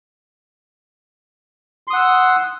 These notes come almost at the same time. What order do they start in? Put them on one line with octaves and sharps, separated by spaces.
C6 D#6 F#5 E6